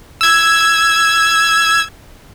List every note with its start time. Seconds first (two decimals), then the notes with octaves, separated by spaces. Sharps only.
0.21 E6 G#6